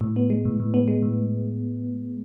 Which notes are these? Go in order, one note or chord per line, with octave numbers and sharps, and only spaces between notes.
A2
B3
G#3
A2
A2
B3
G#3
A2